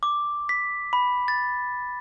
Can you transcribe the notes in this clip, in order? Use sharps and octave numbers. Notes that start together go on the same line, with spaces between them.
D6
B6
B5
A6